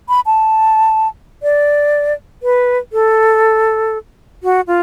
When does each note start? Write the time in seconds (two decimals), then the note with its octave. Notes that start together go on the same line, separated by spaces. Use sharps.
0.09 B5
0.26 A5
1.43 D5
2.43 B4
2.93 A4
4.43 F#4
4.67 F4